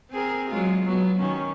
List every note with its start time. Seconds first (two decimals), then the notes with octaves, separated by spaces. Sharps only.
0.11 C4 G#4 A#4
0.50 F#3 G#3 F4
0.84 F#3 B3
1.18 D#3 C#4